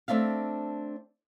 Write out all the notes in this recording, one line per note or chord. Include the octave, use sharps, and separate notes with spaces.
A3 C4 D4 E5 F5